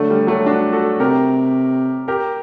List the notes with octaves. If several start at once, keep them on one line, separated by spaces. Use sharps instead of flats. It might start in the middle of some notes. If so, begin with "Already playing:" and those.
Already playing: D3 F#3 A3
G3
F#3 A3
D4 F#4
F#4 A4
C3 G4 A#4
G4 A#4